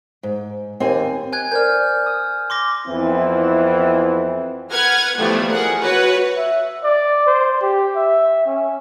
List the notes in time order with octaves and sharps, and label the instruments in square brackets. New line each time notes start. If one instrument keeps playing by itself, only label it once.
[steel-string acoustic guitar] G#2
[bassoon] D#2 [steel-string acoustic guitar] C4 G#5
[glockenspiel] G#5 F#6 G#6
[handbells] A#4 C5 D5 [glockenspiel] F6 G6
[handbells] D#6
[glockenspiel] C6 D6 A#6
[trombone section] F2 E3 B3 C4 E4
[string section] B4 F#5 F6 G#6
E3 F3 G3 A3 B3
G#4 A#4 F#5
F#4 B4 C#5 F#5
[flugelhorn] E5
D5
C5
G4
E5
C#4